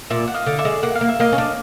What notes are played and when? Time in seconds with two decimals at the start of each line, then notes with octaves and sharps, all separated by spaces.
0.10 A#2 D5 E5
0.28 F#5
0.34 D#5 F5
0.46 D3
0.59 D5 E5
0.65 G#3
0.83 A#3 F#5
0.95 F5
1.01 A#3
1.09 E5
1.20 A#3 D#5 F5
1.33 C#4
1.38 D4